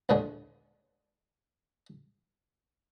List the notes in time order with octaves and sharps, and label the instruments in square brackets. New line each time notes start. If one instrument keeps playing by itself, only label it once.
[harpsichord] A#1 D#2 A2 D3 G#3